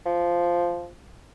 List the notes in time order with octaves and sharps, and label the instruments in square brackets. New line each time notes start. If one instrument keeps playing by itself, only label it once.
[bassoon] F3